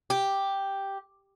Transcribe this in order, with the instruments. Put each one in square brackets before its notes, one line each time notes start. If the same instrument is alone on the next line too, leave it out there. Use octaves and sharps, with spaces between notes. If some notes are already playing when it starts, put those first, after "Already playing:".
[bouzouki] G4